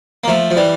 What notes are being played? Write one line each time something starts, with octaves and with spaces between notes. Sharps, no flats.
A#3
F3 A3
F3
E3 G3